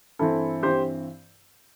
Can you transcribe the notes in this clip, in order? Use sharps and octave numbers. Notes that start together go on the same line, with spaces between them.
G2 E3 C4 E4 A4
G2 E3 C4 G4 C5